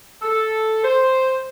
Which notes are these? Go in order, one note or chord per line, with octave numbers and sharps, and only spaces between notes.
A4
C5